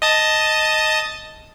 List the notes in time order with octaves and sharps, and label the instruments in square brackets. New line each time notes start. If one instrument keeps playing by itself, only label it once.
[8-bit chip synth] D#5 A5 D#6